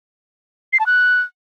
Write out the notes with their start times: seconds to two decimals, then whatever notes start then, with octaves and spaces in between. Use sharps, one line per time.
0.73 C7
0.80 A5
0.86 F#6